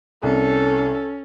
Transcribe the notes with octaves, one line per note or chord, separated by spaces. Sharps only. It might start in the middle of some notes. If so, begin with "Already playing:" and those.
C2 C#4 A4